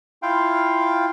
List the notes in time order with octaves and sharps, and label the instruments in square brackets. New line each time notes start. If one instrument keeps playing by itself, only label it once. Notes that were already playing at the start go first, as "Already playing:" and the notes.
[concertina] E4 F4 F5 G5